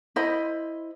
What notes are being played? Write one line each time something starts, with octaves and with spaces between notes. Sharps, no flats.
E4 C5 D#5 B5